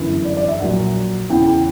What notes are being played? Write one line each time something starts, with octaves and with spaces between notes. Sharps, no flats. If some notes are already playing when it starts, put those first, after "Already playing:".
Already playing: G1 F#2 E3
D5
D5
E5
A#1 A#2 F#3 F#5
E2 C#3 E3 G5
G5